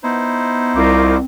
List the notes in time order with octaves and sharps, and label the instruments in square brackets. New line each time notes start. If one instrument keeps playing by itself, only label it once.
[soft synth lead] B3 [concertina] D#4 E4 C5
[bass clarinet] C2 [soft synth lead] C4 [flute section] F4 A#4 D6